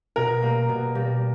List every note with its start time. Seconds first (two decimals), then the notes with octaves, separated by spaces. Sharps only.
0.16 B2 A#4
0.42 G3 A#3
0.69 B2
0.95 G3 A#3